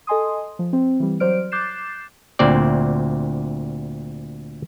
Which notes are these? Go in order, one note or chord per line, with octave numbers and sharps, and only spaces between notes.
A4 D#5 G#5 C6 D#6
F3
C4
E3 G3
F#3 C5 D5 F6 D7
D6 F#6 G6 A6 C7 E7
D2 A#2 C4 D5